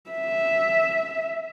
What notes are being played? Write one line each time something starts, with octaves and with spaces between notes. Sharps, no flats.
E5